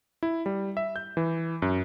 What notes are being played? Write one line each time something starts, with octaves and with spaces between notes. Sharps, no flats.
E4
G3
E5
G6
E3
F#2